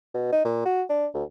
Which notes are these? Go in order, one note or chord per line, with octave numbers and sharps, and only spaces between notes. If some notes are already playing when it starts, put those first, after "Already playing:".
B2
D#4
A#2
F#4
D4
D2